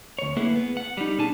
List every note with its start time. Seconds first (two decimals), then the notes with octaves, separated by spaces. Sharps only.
0.19 D2 C#5
0.36 A3 A#3 E4 G#4 B4 F#5
0.56 B3
0.77 F#5
0.97 G3 D#4
1.18 B2 D4 G#4 G#5 A5